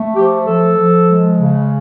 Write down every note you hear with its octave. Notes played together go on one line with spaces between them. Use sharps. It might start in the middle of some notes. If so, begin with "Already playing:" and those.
Already playing: A3
F3 G4
F3 A4
F3
G#3
C#3